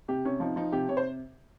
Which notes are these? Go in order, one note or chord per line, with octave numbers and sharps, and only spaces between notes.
C3 G4
C3 C#4
F3 D#4
F3 D#4
C3 G4
C3 C#5
C5